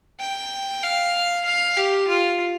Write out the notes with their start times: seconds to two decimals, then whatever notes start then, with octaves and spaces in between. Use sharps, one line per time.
0.20 G5
0.83 F5
1.45 F5
1.77 G4
2.07 F4